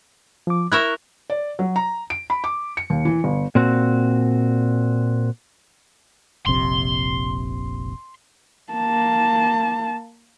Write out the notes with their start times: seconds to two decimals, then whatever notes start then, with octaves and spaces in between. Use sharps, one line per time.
0.47 F3 D6
0.72 E4 A#4 E5 C#6 F#6
1.30 D5
1.59 F#3
1.76 A#5
2.10 D7
2.30 B5
2.44 D6
2.77 C#7
2.90 D#2
3.05 E3
3.24 G1
3.55 A#2 C4 F#4
6.47 F1 A#1 C3 C6
8.73 A#3 A5